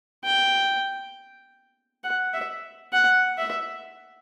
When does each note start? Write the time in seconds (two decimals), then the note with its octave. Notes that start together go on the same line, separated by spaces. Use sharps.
0.25 G5
2.04 F#5
2.34 E5
2.93 F#5
3.38 E5